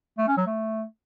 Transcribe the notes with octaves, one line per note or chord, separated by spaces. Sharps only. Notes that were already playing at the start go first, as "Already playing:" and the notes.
A3
C#4
F#3
A3